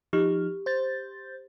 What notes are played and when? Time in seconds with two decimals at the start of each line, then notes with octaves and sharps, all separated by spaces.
0.13 F3 D#4 G4 F6
0.66 C5 G6 A6